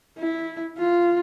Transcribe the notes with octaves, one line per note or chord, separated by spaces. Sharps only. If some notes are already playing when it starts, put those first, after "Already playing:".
E4
F4